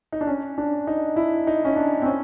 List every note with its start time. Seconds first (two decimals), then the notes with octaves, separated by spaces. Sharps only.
0.12 D#4
0.21 D4
0.27 C#4
0.58 D4
0.87 D#4
1.16 E4
1.47 D#4
1.65 C#4
1.76 D4
2.02 C4
2.06 C#4